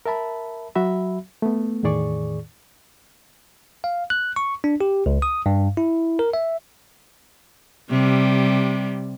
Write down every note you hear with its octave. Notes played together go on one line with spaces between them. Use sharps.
A#4 E5 A5 B5
F#3 F#4 E5 B5
A3 B3
E2 A2 D#3 G#4 D5 C#6
F5
F#6
C#6
D4
G4
C#2
D#6
G2
E4
A#4
E5
C3 G3